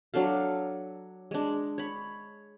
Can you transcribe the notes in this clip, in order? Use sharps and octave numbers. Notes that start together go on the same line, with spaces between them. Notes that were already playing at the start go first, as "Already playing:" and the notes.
F#3 D4 A4 F5
G#3 D4
C#5 B5